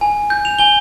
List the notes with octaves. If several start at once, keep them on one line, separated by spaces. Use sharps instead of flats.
G#5
G6
F7
G#5 G7